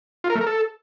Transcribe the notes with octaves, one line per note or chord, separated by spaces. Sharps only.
F4
A#4
A3
A#4
A4